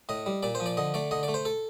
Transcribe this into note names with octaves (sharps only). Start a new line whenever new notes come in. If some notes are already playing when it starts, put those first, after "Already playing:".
A2 D#5
G3
A#2 D5
C5
F3
D5
D3 D#5
A3 D5
D3 D#5
D5
A3
C5
A4